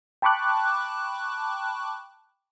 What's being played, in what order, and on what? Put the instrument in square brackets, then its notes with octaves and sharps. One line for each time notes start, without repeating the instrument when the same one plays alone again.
[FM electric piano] G5 A5 B5 C#6 D6 F#6